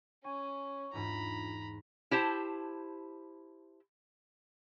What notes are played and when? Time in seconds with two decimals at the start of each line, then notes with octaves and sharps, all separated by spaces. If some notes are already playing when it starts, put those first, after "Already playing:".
0.24 C#4 G#5 C#6
0.93 E2 G#2 D4 F4 A#5 B5
2.11 E4 G4 C5 A5